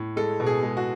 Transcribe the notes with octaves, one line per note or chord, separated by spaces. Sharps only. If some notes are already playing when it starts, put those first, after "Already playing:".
Already playing: A2
G#3 A4
B2
G#4
G#3
F#4